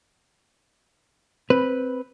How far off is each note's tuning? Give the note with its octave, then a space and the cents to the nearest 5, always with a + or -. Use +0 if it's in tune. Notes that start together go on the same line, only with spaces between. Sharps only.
C4 +0 B4 +0